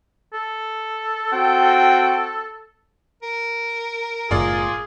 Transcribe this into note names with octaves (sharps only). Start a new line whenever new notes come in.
A4
C4 F#4 G5
A#4
F#1 A2 F4 G#4 D5 F5